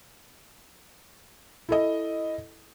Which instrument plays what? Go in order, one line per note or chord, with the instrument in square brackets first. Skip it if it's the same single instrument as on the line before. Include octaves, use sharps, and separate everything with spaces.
[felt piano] E4 A4 D#5